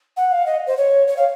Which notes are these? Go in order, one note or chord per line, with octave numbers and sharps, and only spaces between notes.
F#5
F5
D#5
C5
C#5
C#5
F5